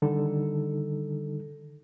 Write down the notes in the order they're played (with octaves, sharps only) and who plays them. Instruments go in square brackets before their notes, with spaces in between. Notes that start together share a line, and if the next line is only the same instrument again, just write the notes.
[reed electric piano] D3 D#3 G3 D#4 A4